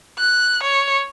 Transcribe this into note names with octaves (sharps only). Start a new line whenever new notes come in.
F#6
C#5